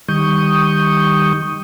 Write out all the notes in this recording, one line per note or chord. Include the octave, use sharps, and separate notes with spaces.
D#3 G3 C#6 D#6 G6